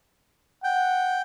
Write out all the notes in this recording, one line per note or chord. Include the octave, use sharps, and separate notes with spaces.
F#5 G5